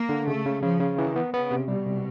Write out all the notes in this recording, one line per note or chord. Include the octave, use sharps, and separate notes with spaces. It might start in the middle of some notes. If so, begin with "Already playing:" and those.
Already playing: A#3
D3
C#3 A3
C#3
C#3 F3
C#3
D#3 E3
B3
C#3 B3
C3
B2 G3
C3